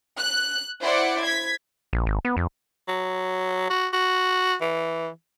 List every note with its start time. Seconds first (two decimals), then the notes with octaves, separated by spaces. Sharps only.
0.18 F#6
0.82 E4 C5 D5 F#5
1.23 G#6 B6
1.93 A#1
2.06 G#1
2.25 B3
2.37 F2
2.88 F#3
3.70 F#4
3.93 F#4
4.61 E3